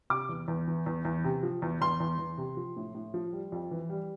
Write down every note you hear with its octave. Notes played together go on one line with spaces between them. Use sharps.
C3 D6
E2
E2
E3
E2
E2
C3
F3
E2
E2 C6
E2
E2
C3
F3
A2
A2
F3
G3
F2
E3
G3